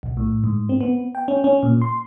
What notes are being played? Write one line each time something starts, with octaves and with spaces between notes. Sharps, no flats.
B1
A2
G#2
C4
B3
G5
C#4
C#4
A#2
C6